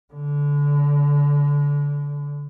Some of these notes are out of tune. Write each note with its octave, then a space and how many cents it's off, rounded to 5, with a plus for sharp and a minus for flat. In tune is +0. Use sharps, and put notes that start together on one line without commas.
D3 -25